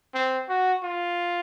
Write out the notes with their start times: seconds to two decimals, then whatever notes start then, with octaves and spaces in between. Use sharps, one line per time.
0.14 C4
0.49 F#4
0.83 F4